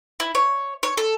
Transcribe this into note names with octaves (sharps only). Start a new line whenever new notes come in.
E4
C#5
C#5
A4